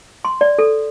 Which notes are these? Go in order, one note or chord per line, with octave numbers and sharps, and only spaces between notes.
C6
D5
A4